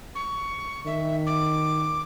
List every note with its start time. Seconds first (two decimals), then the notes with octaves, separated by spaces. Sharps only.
0.15 C#6
0.86 D#3 E5
1.26 D6